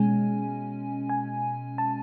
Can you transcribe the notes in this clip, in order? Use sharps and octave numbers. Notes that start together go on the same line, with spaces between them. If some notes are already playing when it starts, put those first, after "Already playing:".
Already playing: B2 G#3 C#4 G#5
G#5
A5